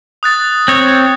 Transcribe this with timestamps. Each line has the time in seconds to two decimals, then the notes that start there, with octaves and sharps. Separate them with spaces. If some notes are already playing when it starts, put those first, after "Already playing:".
0.23 D#6 F#6 A6
0.68 C4 C#5